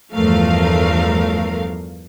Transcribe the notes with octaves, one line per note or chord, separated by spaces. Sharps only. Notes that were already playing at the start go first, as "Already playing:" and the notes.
E2 G2 F3 A3 A#4 F5